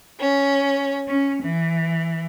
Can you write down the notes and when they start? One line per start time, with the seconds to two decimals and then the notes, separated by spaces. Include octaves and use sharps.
0.20 C#4
1.08 C#4
1.43 E3